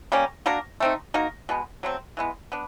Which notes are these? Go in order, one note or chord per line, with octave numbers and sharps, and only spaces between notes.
G3 A#3 C#4
A#3 D4 F#4 A#4
A3 C4 D#4
A#3 D#4 F#4 A#4
B2 G#3 B3
F#3 A3 C4
E3 G#3 B3
B3 D4